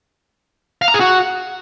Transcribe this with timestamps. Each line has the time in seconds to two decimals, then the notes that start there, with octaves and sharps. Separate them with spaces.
0.82 F5
0.88 A#5
0.94 G#4
1.00 F#4